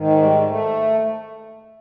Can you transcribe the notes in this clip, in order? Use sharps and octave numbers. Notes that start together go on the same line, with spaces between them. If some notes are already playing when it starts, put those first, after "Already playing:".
Already playing: G#2 D#3
G#3
G3
G#3
A3